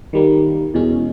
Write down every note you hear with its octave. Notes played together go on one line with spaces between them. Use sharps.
D#3 G3 A#3
E2 B2 G#3 C#4